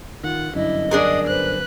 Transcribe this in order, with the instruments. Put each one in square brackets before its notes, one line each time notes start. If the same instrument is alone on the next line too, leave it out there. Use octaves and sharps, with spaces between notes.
[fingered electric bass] D#3 [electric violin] F4 F#5
[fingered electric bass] G1 F#2 [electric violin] D4 E4 [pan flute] D#5
[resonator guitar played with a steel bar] D4 G#4 A#4 [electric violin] F#5 D#6
[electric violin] B4 F#6 [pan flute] C5